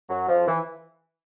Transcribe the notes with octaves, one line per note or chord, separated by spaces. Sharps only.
F#2 F#3
F2 F3
E3